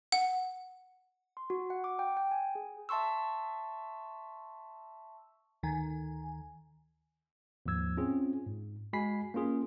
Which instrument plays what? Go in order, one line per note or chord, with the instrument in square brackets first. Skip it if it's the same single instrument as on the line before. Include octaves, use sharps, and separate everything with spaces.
[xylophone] F#5
[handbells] C6
F#4
F#5
D6
G5
G5
G#5
G#4
E5 A5 C6 C#6 E6
[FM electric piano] D2 D#3 G#5
[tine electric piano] D#2 G#2 F3 E6 G#6
C4 C#4 F4 G#4
G#2
G#3 F#4 G#5 B5 B6 C7
A#3 C#4 F4 G#4